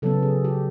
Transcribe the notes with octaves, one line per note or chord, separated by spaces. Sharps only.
C#3 F#3 B3 A4
G#4
G4